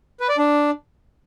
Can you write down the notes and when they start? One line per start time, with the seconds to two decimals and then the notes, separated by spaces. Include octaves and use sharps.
0.20 B4
0.29 D5
0.38 D4